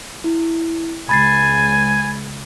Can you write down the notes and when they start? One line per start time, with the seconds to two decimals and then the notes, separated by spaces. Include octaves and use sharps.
0.24 E4
1.09 C#2 G#5 B5 A6 C7